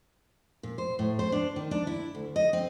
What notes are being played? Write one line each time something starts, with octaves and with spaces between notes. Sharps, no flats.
A#2
C5
A2
C5
D4
D#3
D4
E4
D2
D#5
C4